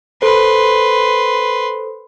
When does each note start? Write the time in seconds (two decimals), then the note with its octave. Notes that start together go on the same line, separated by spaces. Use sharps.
0.22 A4 B4 C5 C6